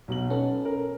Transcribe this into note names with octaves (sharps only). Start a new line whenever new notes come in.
B1 B2 F#7
C#4 A4 B4
A#4